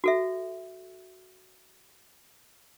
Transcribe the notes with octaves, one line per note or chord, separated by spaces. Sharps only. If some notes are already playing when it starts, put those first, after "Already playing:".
F#4 A4 E5